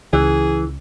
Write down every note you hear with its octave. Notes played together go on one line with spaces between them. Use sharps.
C#2 E3 G#4